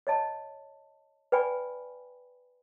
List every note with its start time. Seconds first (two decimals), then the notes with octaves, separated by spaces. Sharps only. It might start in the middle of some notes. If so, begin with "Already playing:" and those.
0.07 C#5 D#5 A5
1.32 B4 D5 G5 G#5 B5